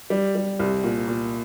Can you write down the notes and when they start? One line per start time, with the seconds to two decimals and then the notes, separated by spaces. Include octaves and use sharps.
0.10 G3
0.35 G3
0.59 C2
0.84 A#2
1.08 A#2